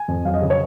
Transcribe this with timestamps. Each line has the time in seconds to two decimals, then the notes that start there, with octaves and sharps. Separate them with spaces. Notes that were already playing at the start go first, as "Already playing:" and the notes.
Already playing: G#5
0.08 F2
0.25 F#3 F5
0.34 D#5
0.42 C#3
0.50 C#5